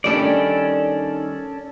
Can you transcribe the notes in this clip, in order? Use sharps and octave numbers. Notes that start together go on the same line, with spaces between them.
D#3 G3 C#4 D4 A4 D5